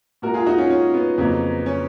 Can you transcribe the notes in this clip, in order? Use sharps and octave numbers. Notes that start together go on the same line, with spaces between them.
A#2 G#3 F#4 A#4
F4 G#4
D#4 F#4
C#4 F4
C#4
B3
F2 C#3 F#3 A#3
C#4